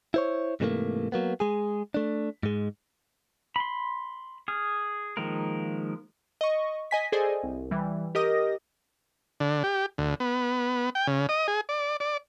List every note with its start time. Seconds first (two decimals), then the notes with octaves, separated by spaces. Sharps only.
0.14 E4 C5 C#5
0.60 G#2 C3 E3 G3 A3 A#3
1.12 F#3 A#3 B3
1.40 G#3 G#4
1.94 A3 D4
2.43 G#2 G#3
3.56 B5 C6
4.48 G#4 F6
5.17 D#3 F3 G#3 A#3 A#4
6.41 D#5 C#6
6.91 D#5 G#5 B6
7.12 G#4 A4 C5 D5 D#5 G#5
7.43 C2
7.71 E3 G3
8.15 G4 A#4 D#5 D#6 A#6
9.40 D3
9.64 G4
9.98 D2
10.20 B3
10.95 G5
11.07 C#3
11.29 D#5
11.48 G#4
11.69 D5
12.00 D5